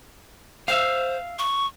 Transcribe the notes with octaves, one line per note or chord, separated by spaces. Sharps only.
C5 E5 F5
C#6